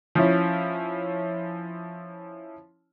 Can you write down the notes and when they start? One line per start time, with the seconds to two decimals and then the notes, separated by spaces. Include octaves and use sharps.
0.15 F3 C#4 E4